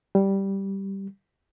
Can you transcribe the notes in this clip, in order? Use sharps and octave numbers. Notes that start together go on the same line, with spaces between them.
G3